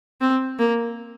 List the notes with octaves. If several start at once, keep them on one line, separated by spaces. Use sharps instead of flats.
C4
A#3